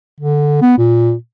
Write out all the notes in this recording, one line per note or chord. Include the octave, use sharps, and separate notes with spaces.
D3
B3
A#2